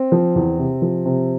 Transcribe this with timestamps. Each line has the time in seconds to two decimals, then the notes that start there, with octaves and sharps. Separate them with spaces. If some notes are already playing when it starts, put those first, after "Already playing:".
Already playing: C4
0.12 F3
0.35 E2
0.58 C3
0.82 F3
1.05 C3